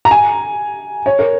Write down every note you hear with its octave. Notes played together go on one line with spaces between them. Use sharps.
A#5
G#5
C#5
A#4